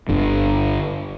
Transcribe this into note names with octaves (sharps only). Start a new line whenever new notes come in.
G1 D3